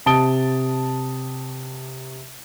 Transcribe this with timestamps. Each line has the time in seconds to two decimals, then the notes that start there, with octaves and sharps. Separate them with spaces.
0.06 C3 A5 D#6 D7 G7